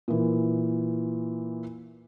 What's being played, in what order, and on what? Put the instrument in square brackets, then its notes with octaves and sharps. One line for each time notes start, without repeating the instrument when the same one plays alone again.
[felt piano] A#2 E3